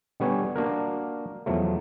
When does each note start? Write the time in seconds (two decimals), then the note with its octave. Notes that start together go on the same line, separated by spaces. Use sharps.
0.20 D3 G3 B3 C#5 G#5
0.56 A#3 D4 F#4 A#4
1.46 E2 F3 F#3 A3